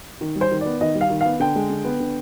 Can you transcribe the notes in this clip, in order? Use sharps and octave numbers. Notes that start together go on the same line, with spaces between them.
D#3
G3
C5
D#3
B3 D5
D#3 D#5
G3
F5
D#3
B3 F5
D3 G5
G#3
D3
B3
D3